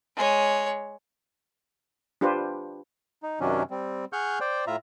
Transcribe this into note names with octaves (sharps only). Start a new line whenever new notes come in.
G#3 C#5
D4 F4 G4 B4 C5
D#4
F#2 C3 D#3 F#3 C#4 D4
G3 C4
G#4 F#5 C#6 F6 G6
C5 D5 G5
A2 F4 E5 A#5